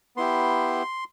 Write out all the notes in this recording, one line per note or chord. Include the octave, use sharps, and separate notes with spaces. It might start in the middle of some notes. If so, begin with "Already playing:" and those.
B3 E4 G4 C6